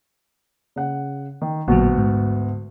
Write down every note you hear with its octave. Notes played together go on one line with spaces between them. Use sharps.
C#3 F#5
D#3
A1 D2 A#2 F#3 B3 F#4
G#2